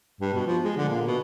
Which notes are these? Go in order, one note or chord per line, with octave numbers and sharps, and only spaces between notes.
G2
B2
F3
G#3
D3
A#2
B2